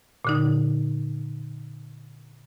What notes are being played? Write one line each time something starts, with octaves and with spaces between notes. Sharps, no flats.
A#2 D3 D#4